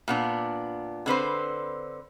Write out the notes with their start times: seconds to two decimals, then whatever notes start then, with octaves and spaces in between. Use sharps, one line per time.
0.08 A#2 B3 D4
1.06 D3 C4 B4 C5